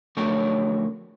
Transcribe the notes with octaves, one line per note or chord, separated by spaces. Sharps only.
F2 D3 F#3 A3 A#4 C#5